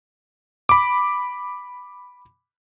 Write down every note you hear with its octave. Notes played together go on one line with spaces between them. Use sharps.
B5 D6